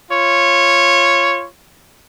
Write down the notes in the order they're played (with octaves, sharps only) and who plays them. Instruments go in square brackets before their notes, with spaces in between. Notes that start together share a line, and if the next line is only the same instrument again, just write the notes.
[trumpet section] F4 C#5